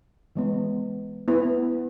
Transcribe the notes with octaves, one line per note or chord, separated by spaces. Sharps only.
E3 G#3 B3
B3 E4 B4